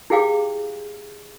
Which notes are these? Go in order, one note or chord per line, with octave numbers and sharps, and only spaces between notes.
E4 G4 G#4 F5 G5 D6